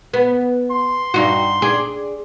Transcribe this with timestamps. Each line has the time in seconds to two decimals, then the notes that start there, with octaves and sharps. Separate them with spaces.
0.14 B3
0.71 C6
1.14 G2 D#4 F#4
1.62 G#4 D5